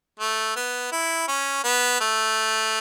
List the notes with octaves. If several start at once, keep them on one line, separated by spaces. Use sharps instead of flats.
A3
B3
E4
C#4
B3
A3